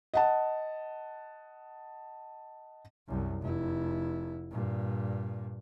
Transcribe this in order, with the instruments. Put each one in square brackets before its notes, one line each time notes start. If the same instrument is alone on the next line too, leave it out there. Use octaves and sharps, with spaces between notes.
[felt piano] D#5 F#5 A5
[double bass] C2 F#2
F1 E4
G2 A#2